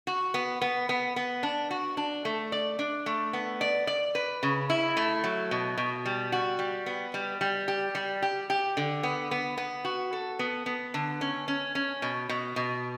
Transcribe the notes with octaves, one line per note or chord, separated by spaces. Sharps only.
F#4
B3
B3
B3
B3
D4
F#4
D4
A3
D5
D4
A3
B3
D5
D5
B4
C#3
E4
A3
F#3
B2
B2
G3
F#4
G3
B3
G3
G3
G4
G3
G4
G4
D3
B3
B3
B3
F#4
A4
B3
B3
D3
C#4
C#4
C#4
B2
B2
B2